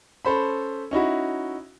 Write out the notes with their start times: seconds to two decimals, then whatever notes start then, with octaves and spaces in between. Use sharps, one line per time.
0.25 C#4 A4 C5 B5
0.91 C#4 D#4 E4 F#4